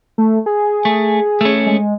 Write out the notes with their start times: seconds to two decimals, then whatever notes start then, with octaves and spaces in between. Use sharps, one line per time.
0.18 A3
0.46 G#4
0.85 A3
1.41 A3 C#4
1.66 G#3